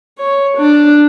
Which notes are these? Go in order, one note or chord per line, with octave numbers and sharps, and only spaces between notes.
C#5
D4